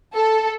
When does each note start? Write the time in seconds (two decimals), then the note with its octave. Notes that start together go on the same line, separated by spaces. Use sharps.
0.14 A4